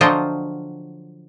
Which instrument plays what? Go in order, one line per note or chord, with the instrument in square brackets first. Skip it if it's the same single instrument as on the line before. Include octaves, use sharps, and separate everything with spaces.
[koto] D3 F3 F#3 F4 D#5 G5